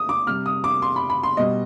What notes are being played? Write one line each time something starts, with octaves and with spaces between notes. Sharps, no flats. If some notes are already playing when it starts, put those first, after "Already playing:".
Already playing: D#6
D6
C3 G3 F6
D#6
D6
C6
B5
B5
C6
B2 G3 D#5